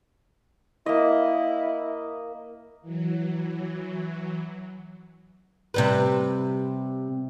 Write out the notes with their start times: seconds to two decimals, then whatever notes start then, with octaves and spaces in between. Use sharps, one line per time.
0.86 A#3 E4 D#5
2.82 E3 F#3
5.74 C3 G3 B4